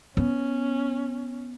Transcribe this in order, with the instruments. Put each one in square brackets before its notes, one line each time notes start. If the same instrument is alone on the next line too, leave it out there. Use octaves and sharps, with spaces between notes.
[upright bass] B3 [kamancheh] C#4